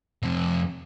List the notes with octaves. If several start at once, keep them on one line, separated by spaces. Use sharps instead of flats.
F2 C3